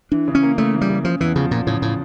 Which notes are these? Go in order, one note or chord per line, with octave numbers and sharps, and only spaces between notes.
E3 D4
C#3
C#4
A#3
C#3 A3
E3
G3
C#3
C#3 F3
E2 E3
C#3 F3
E2 A#2
A2 C#3
A2